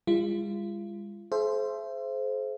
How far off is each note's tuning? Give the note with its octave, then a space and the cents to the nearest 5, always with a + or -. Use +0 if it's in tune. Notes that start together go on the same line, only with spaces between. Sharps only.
G#3 -40 F4 -35
G#4 +45 C5 +0 E5 +35